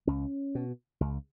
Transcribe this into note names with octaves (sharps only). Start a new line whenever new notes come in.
C#2 C#4
B2
C#2